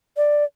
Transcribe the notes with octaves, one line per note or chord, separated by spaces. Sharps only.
D5